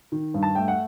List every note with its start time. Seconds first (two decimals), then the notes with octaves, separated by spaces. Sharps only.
0.12 D#3
0.34 G2
0.43 A5
0.55 A3 G5
0.68 F#5